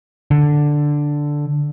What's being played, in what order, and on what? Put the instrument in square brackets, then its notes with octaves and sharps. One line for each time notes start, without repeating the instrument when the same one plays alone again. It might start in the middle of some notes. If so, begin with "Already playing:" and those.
[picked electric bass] D3